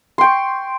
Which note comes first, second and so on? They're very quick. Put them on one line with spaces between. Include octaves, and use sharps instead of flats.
C6 G5 C#6